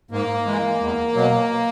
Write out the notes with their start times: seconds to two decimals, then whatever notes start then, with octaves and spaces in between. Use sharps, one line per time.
0.11 G#2 A#3
0.46 E3 G#3
0.80 E2
1.14 B2 F#3